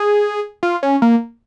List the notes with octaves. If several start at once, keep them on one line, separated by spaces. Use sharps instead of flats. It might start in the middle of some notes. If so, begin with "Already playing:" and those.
Already playing: G#4
F4
C#4
A#3